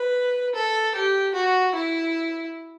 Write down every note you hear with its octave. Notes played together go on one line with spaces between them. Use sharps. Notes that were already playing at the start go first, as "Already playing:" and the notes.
Already playing: B4
A4
G4
F#4
E4